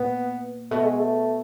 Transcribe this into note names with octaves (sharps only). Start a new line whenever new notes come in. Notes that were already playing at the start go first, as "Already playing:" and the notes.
Already playing: A#2 B3
B2 A3
G#3
A3